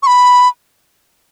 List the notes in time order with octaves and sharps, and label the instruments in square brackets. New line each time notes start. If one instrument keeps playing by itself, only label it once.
[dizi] C#6
B5